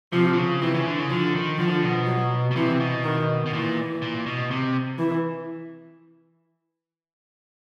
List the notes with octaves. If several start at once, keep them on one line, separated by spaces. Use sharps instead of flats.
C3 F3
D3
C#3
C3 E3
C#3
D3
C#3
D3 F3
D#3
D3 F3
B2
F#3
B2
C3 E3
B2
D#3
B2
A#2 E3
A#2
B2
C3
E3